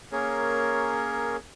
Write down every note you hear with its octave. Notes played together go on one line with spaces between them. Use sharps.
A#3 C#4 G#4 A#4 C#5